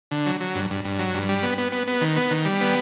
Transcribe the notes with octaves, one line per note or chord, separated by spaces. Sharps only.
D3
F#3
F#3
G2
G2
G2
F#3
G2
G3
B3
B3
B3
B3
D#3
B3
D#3
G3
B3